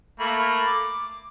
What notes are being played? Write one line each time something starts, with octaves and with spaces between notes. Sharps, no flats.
A3 A#3 B5
D6